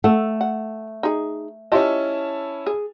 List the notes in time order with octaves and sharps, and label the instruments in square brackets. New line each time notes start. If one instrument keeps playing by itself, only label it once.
[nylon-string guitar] A3 [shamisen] A4 F#5
[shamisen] F#5
D#4 G#4
[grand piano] C#4 E4 A5 [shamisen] F4 G4 D#5
[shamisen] G#4